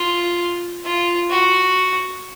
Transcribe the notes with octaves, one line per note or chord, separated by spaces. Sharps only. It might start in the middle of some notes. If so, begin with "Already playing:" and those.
Already playing: F4
F4
F#4